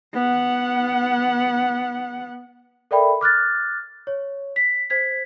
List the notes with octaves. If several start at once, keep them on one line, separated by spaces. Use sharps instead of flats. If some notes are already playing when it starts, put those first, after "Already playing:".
B3 F#5
A4 A#4 D5 E5 G5 B5
D6 F6 F#6 A6
C#5
B6
C5 G#6 B6